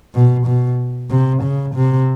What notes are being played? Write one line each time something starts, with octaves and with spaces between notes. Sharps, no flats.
B2
B2
C3
C#3
C3